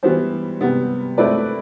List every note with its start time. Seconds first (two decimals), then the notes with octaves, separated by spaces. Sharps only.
0.03 E3 G3 B3 F#4 C5
0.61 C3 G3 B3
1.18 A3 C4 E4 B4 D5